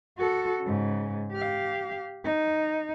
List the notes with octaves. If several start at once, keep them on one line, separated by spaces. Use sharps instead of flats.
F#4 A4
G#2 C#3
G4 F5
D#4